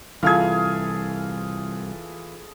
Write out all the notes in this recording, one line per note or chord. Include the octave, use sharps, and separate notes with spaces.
C2 E3 F4 G#4 A4 F5 G#6